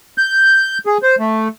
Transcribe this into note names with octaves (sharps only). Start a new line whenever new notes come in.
G6
G#4
C5
A3